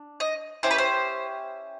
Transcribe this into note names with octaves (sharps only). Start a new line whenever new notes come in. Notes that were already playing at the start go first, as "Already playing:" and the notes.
Already playing: D4
D#5
C#4 E4 G4 C5
B4
C5